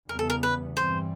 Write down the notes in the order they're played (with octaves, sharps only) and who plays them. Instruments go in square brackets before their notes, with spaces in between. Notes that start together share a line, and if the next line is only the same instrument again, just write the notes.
[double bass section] E2 C#3 E3 G3 B3 [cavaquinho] A#4
[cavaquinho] A4
A#4
B4
[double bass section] G2 E3 G3 C4 [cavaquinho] C5